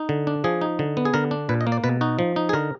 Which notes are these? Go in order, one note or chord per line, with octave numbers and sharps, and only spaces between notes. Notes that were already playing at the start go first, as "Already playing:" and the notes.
Already playing: D#4
D3
D4
F3 G#4
D#4
D3
B3
G#4
D3 A#4
D4
A#2 B4
D#5
A#3
D5
B2 B4
D#4 F#4
F3
D#4
G#4
D3 A#4